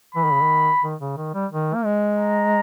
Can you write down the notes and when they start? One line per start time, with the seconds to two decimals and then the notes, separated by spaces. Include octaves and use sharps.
0.15 E3 B5
0.24 D#3
0.32 C#3
0.41 D#3
0.83 D#3
1.00 C#3
1.17 D#3
1.34 G3
1.51 D#3
1.74 A#3
1.85 G#3
2.19 A#5